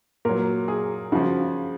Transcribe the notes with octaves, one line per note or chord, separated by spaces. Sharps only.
A#2 F#3 A#4
G#4
C#3 F3 F#4